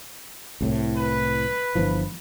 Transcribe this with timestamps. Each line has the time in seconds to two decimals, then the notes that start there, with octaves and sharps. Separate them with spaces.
0.61 C2 A2
0.97 B4
1.75 G1 E3 F3